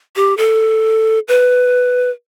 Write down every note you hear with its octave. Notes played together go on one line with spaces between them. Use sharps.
G4
A4
B4